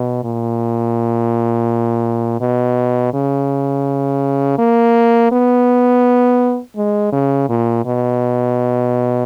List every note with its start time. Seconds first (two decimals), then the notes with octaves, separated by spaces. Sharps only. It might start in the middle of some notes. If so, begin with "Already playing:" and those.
Already playing: B2
0.24 A#2
2.41 B2
3.13 C#3
4.58 A#3
5.32 B3
6.77 G#3
7.12 C#3
7.49 A#2
7.85 B2